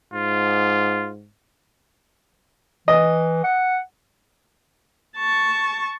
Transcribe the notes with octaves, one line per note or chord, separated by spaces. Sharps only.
G#2 F4
E3 D#5
F#5
A5 C#6